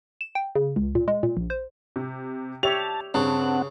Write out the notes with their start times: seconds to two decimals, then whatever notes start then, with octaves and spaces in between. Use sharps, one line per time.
0.21 E7
0.35 G5
0.55 C#3
0.76 C#2
0.95 A#2
1.08 G#3
1.23 A#2
1.37 A#1
1.50 C5
1.96 C3
2.63 G4 C#5 E5 A5 F7
3.14 G2 C#3 C4 F#5